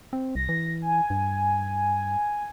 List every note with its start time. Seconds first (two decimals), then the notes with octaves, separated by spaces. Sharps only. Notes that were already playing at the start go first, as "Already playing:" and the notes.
0.13 C4
0.35 C2 A#6
0.49 E3
0.82 G#5
1.10 G2